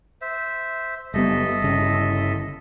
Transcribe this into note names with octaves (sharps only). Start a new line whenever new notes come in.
C5 E5
F#1 G3 B3 A4 D#5 E5
G1 C#3